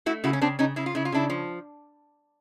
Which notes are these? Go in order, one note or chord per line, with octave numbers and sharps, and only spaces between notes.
A3 E4 F#4
C#3 E4 F#4
C#4
C#3 C4 D4
C#3 C#4 D#4
C#3 E4
F4
C#3 E4
F4
C#3 D4 E4
F3